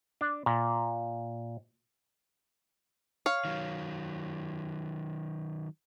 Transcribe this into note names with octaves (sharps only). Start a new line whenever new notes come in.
D4
A#2
C#5 F5
D#3 F#3